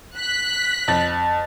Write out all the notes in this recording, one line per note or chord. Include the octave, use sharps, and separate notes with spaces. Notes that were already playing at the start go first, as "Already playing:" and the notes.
F#6 B6
F2 A6 F#7